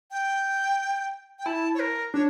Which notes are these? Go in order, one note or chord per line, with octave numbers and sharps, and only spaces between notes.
G5
G5
E4 A5
C#5
A#4
D4 C#5